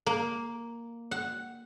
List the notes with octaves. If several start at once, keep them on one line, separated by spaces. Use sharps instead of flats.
A#3
F#5